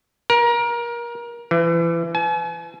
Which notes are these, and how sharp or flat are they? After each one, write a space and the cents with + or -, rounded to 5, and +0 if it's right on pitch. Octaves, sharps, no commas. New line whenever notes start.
A#4 +25
E3 +30
G#5 +45